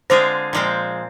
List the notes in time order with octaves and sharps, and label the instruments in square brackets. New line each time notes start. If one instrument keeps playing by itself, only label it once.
[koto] D3 G#3 C4 F4 G#4 [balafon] C5
[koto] A#2 F3 G#3 C4